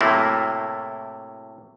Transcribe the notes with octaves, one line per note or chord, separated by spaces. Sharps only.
A2 C3 F#3 A3 A#3 E4